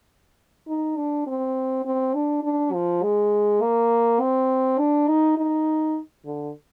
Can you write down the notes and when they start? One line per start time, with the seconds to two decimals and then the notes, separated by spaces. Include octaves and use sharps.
0.68 D#4
0.97 D4
1.26 C4
1.85 C4
2.14 D4
2.43 D4
2.73 F3
3.03 G#3
3.61 A#3
4.20 C4
4.78 D4
5.08 D#4
5.37 D#4
6.26 D3